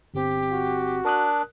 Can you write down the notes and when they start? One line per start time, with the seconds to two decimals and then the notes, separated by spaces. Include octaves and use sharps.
0.14 G1 C4 G4
0.50 F#4
1.05 D4 A#4 D#6 F#6